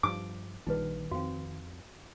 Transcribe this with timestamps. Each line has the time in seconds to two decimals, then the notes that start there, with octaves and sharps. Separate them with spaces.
0.03 G2 F3 D6
0.67 A#1 D#3 G3 D#4 B4
1.11 F2 C4 F#4 F5